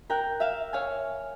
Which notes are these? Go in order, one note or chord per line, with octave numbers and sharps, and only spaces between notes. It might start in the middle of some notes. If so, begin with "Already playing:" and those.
A#4 G5 A#5 F#6
E5 F5
C#5 F5 G#5